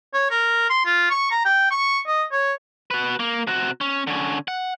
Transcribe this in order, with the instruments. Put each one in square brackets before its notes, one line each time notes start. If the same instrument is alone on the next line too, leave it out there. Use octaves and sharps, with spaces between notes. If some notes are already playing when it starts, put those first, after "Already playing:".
[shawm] C#5
A#4
C6
F4
C#6
A#5
G5
C#6
D#5
C#5
[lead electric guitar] F#4 B4
A#3
C3 F#4
C#4
D3 C#4
F#5